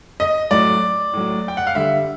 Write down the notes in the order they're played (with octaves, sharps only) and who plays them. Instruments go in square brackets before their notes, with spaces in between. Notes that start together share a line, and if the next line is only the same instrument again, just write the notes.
[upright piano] D#5
A2 F#3 D5
A2 F#3
G5
F#5
F5
D3 G3 E5